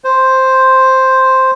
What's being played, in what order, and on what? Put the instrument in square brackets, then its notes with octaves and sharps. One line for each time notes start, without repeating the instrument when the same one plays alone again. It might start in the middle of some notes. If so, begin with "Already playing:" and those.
[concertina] C5